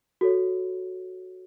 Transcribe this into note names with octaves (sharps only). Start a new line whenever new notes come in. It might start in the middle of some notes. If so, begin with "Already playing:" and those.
F#4 A4 C#5